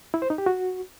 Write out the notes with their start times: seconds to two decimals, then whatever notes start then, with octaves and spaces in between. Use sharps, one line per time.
0.14 E4
0.22 C5
0.30 D#4
0.38 G4
0.46 F#4